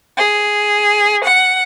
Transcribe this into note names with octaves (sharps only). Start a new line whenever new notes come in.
G#4
F#5